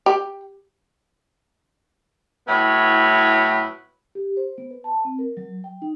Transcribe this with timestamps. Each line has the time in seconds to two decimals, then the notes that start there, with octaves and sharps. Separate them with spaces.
0.06 G4
2.48 A2 F#3 B3 E4 C#5
4.15 G4
4.37 C5
4.58 B3
4.71 B4
4.84 A5
5.05 C4
5.19 A#4
5.37 F#3
5.64 G5
5.82 D#4